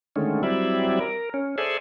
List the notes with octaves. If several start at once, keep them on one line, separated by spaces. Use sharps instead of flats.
D3 D#3 G#3 A3 C#4
F#3 G3 C4 E4 D5 E5
A#4
C#4
G#4 A4 C5 D5 E5 G#5